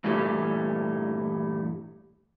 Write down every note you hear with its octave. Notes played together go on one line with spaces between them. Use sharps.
G2 A#2 E3 G3 A3